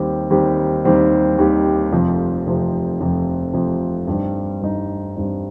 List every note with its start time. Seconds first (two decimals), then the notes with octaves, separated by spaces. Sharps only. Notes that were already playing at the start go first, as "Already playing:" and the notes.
Already playing: D#2 D#3 G3 C4 G4
0.30 D#2 D#3 G3 C4 G4
0.85 D#2 D#3 G3 C4 G4
1.38 D#2 D#3 G3 C4 G4
1.92 F1 F2 C3 F3
2.46 F1 F2 C3 F3
3.00 F1 F2 C3 F3
3.53 F1 F2 C3 F3
4.07 G2 G3 C4 D#4
4.61 G2 G3 C4 D#4
5.15 G2 G3 C4 D#4